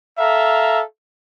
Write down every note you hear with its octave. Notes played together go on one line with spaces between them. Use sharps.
A4 E5 F5 A#5